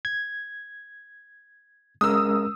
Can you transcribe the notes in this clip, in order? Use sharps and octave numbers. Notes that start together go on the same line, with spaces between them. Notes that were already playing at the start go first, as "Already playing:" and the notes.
G#6
G#3 C#4 A#4 D#6 E6